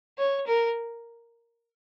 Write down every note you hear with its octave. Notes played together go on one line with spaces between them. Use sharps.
C#5
A#4